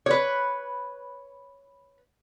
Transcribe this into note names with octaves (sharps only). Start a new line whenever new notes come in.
B4 C#5